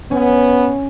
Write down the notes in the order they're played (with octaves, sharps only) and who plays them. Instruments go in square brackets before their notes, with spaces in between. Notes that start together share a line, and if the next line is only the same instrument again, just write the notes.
[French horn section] B3 [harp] C#4